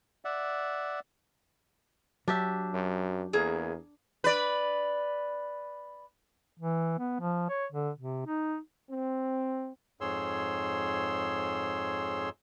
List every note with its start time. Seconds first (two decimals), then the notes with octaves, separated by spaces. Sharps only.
0.25 D5 E5 F#5
2.28 F#3 D4 G4 E5
2.73 F#2
3.33 E2 A#3 G#4
4.24 B4 D5
6.59 E3
6.99 B3
7.20 F3
7.49 C#5
7.72 D3
7.98 C3
8.26 D#4
8.90 C4
10.01 F2 G#2 G#4 C#5 C6 E6